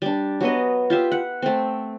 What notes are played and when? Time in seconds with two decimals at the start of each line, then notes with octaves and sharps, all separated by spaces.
0.02 G3 D4
0.41 F#3 B3 D#5
0.90 F4 G4 E5
1.12 F#5
1.42 A3 C4